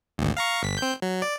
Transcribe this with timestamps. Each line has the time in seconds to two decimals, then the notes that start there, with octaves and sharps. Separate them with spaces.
0.18 G#1 D2
0.37 F5 A#5 C#6
0.63 G1 B6
0.78 C4 G6
1.02 F#3
1.22 D5